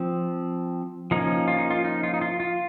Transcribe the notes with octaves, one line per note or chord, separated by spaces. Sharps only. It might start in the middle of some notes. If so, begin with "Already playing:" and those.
Already playing: F3 C4
F3 A#3 C#4 D#4
F4
D#4
F4
D#4
F4
D#4
F4
F4